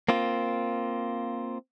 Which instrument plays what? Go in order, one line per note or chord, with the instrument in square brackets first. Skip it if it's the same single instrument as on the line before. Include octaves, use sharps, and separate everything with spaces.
[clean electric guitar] A#3 C4 F4